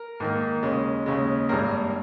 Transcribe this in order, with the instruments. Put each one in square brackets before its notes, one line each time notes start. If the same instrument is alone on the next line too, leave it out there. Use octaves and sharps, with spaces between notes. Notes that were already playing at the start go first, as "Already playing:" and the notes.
Already playing: [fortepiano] A#4
G#2 D#3 A#3
D#2 C#3 G#3
D#2 C#3 G#3
G#1 G2 G3 A#3 A#4